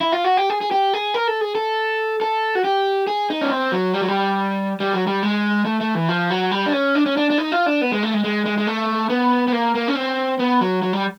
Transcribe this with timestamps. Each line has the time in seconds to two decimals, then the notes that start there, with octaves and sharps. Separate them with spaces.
0.01 E4
0.12 F4
0.25 F#4
0.37 G4
0.50 G#4
0.61 G#4
0.71 G4
0.94 G#4
1.14 A#4
1.28 A4
1.41 G#4
1.55 A4
2.21 A4
2.55 F#4
2.64 G4
3.07 G#4
3.30 D#4
3.41 C#4
3.52 C4
3.72 F#3
3.94 G3
4.01 F#3
4.08 G3
4.80 G3
4.93 F#3
5.07 G3
5.23 G#3
5.65 A3
5.81 A3
5.95 E3
6.09 F3
6.30 F#3
6.51 G3
6.66 D4
6.73 C#4
6.95 D4
7.06 C#4
7.17 D4
7.30 D4
7.38 D#4
7.52 F4
7.66 D4
7.81 B3
7.92 G#3
8.03 A3
8.14 G#3
8.24 G#3
8.46 G#3
8.58 G#3
8.67 A3
9.09 B3
9.48 B3
9.52 A#3
9.75 A#3
9.88 C#4
9.95 C4
10.39 B3
10.61 F#3
10.82 F#3
10.93 G3